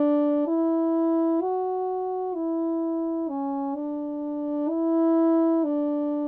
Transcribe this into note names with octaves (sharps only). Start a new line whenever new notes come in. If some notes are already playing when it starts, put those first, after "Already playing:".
Already playing: D4
E4
F#4
E4
C#4
D4
E4
D4